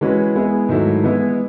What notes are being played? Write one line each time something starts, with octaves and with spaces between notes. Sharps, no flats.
E3 G#3 C#4 F#4 B4
G#3 B3 E4 G#4
G#2 D#3 F#3 A3 E4
E3 G#3 B3 E4